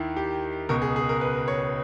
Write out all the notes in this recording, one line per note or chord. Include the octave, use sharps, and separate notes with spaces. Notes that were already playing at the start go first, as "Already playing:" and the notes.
Already playing: D#2 D#3 E4
G4
C#2 B2 A#4
G#4
G#4
A#4
B4
C#5